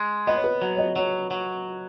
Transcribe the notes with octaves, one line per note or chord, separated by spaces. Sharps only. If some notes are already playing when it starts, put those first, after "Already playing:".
Already playing: G#3
B3 D#5
C#5
B4
F#3
C#5
D#5
F#3 C#5
F#3